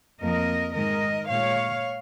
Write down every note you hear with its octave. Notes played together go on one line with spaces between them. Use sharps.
F2 F3 A#3 A#4 D#5
G#2 D#3 G#3 A#4 D#5
A#2 G#3 C#5 F5